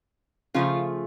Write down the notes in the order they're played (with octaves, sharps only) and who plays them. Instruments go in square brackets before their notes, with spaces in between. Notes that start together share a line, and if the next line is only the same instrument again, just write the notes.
[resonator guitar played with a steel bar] C#3 F3 A3 F4